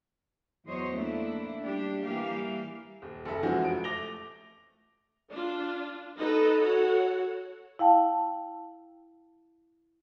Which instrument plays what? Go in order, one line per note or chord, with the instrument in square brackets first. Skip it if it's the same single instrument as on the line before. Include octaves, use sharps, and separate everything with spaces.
[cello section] E2 F#3 C5 C#5 D#5
A3 A#3 D4 E4
G3 D4 G4
E3 G3 A#3 G4 F5
[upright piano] D#1
F#1 A4 E5
E3 F3 G#3 C#4 F#4
F1 D7
A3 D6 A#6 F7 G7
[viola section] D4 F4
D#4 A4 B4 D#5
F#4 A4 C#5 F#5
[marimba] E4 F5 G5 A5